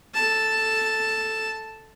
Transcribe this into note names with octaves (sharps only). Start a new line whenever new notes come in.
A4 A5